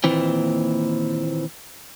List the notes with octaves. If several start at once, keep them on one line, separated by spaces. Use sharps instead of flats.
D#2 A#2 E3 C4